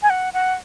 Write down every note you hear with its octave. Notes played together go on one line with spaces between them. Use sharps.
G#5
F#5
F#5